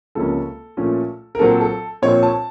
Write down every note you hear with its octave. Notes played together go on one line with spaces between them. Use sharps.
C#2 C3 F3 A#3 C#4 A4
A#2 F3 A3 C#4
A#4
A#2 F#3 C4 A4
A4
A#2 F3 C4 C#5
A5